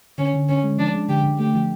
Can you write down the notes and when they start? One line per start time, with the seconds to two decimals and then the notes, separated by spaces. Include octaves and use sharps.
0.18 D3 C#4
0.34 D3
0.49 D3 C#4
0.63 G#3
0.78 F3 D4
0.94 G#3
1.09 D3 G4
1.24 D3
1.38 A3 G4
1.54 F3